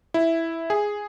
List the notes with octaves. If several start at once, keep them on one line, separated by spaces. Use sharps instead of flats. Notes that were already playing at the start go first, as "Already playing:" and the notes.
E4
G#4